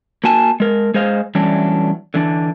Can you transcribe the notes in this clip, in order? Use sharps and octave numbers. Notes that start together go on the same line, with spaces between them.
A#3 F#4 G#5 A5
G#3 A#4
G#3 G#4 C5 D#5 F5
E3 F#3 G3 A3 C#4 D4
D3 E3 D4